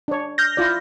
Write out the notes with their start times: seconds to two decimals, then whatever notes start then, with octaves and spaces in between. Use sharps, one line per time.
0.08 D4 C#5
0.38 F6 G6 A#6
0.57 E4 F4 D5